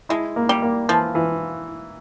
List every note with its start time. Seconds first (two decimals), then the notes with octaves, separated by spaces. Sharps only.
0.09 G#3 E4
0.36 A#3
0.49 G3
0.62 A#3
0.89 E3 F3
1.15 E3